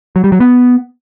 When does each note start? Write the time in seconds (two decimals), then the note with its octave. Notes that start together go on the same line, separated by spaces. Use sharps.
0.16 F#3
0.24 G3
0.32 F#3
0.40 B3